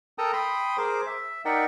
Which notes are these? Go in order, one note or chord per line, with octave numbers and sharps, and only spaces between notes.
A4 A#4 G5 A5 A#5 D#6
G5 B5 C6 D#6
G#4 A#4 C5 D6
E5
D#4 A#4 D5 E5 F#5 G5